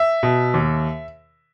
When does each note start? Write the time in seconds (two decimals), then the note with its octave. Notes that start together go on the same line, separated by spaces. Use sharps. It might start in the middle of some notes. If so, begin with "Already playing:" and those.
Already playing: E5
0.23 B2
0.54 D#2